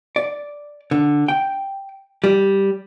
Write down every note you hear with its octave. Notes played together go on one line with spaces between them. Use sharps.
D5
D3
G5
G3